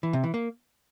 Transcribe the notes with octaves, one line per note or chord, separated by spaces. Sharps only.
E3
C3
E3
A#3